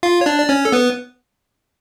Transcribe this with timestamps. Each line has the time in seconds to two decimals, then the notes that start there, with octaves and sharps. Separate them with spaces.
0.03 F4 F5
0.21 C#5
0.26 D4 D5
0.39 D5
0.49 C#4 C#5
0.65 A4
0.72 B3 B4